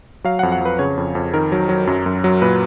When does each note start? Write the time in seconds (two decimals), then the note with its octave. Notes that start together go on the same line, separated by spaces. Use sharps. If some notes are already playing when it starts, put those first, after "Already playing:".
0.24 F#3 F5
0.39 F#5
0.43 F2
0.52 F#5
0.61 F2 B4
0.79 C#3 C#5
0.97 F2
1.15 F2
1.34 D#3 A#4
1.52 F#3
1.69 F#3
1.87 F#2
2.06 F#2
2.24 F#3
2.42 A#2 B4